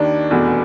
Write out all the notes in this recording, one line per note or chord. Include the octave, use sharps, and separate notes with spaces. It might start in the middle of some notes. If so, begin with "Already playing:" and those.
Already playing: D#2 D#3 D4
F1 E2 B2